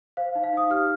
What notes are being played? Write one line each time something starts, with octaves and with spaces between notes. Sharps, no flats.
C5 F5
D#4
F5
D#4 D#6
G4 F6